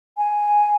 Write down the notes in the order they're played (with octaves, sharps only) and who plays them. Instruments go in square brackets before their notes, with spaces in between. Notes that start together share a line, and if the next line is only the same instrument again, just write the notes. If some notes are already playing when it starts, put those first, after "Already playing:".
[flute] G#5